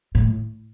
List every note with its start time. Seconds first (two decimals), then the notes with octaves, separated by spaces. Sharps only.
0.15 A2